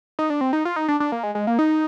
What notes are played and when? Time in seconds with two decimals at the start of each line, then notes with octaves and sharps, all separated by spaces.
0.19 D#4
0.30 D4
0.41 C4
0.53 D#4
0.65 F4
0.76 D#4
0.88 D4
1.00 D4
1.12 A#3
1.23 G#3
1.35 G#3
1.47 A#3
1.59 D#4